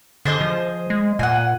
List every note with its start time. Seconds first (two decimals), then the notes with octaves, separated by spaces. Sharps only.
0.25 D3 G#4 C5 D#5
0.41 F3
0.90 G#3
1.19 A#2 F#5 G#5